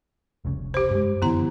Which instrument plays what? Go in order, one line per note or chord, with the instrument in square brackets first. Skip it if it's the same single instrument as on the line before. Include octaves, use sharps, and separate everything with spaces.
[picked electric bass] F1 C2 C#3
[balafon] G4 C5
[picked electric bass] G2 G#3
[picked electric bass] F#2 D3 E3 [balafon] B3 E4 A#5